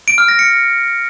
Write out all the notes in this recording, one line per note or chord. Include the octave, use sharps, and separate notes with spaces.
D7
F6
A#6
C#7